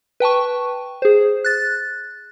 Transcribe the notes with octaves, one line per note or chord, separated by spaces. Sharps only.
B4 G5 A5 C#6
G#4 C5
F#6 A6